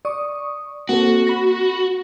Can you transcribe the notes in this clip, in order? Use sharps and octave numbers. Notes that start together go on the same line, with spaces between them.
D5 C#6 D#6
A#3 C4 F#4 A4
B5 A#6